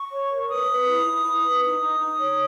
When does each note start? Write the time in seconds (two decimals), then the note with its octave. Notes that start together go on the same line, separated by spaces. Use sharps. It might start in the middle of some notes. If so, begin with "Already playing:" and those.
Already playing: C#6
0.11 C#5
0.30 A#4
0.48 B4 D#6
0.68 B4
0.87 E4
1.06 E4
1.25 E4
1.44 B4
1.63 D#4 D#6
1.82 D#4
2.00 D#4
2.19 C#5